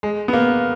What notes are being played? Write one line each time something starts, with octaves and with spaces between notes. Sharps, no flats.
G#3
B3
A#3